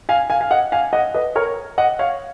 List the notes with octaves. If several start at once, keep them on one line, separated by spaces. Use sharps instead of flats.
F5 G#5
F5 G#5
F5
D#5 F#5
F5 G#5
D#5 F#5
B4 D#5
A#4 C#5
D#5 F#5
C#5 F5